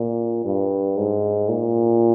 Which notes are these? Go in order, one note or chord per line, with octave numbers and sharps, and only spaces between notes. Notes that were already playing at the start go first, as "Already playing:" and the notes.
Already playing: A#2
G2
G#2
A#2